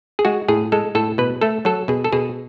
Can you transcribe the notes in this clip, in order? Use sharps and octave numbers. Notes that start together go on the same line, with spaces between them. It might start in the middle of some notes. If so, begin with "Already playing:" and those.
G#4
G#3 F#4
A2 G#4
G#3 A4
A2 A4
B2 B4
A3 A4
F#3 A4
B2 G#4
A4
B2 G#4